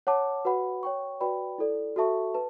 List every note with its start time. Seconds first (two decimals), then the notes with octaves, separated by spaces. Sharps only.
0.07 C#5 F#5 A5 D6
0.45 F#4 B4 F#5 B5
0.83 C#5 G5 C#6
1.20 F#4 B4 D5 G5 B5
1.58 E4 A4 D5
1.96 F#4 A4 E5 A5 C#6
2.34 B4 A5